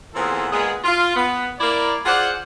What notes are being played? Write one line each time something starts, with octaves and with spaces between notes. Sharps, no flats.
A#2 E3 B3 C4 G#4 A4
A#2 G#3 B3 G#4
F4
B3
A#3 E4 A#4 D5
F4 G#4 C5 D5 F#5